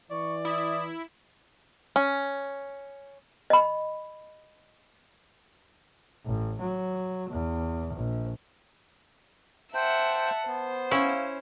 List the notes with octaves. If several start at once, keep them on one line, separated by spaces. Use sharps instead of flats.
E3 D5 C#6
E4 D#6
C#4
D#5 B5
A1
F#3
E2
A#1
C5 E5 F#5 G5 A5
B3 C5
C#4 E4 F5